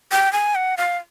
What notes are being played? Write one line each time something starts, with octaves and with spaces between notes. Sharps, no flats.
G5
G#5
F#5
F5